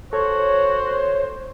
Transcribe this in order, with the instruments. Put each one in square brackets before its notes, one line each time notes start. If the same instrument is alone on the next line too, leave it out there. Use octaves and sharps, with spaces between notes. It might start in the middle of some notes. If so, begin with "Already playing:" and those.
[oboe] F#4 [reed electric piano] A4 [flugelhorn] C5 [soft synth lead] C#5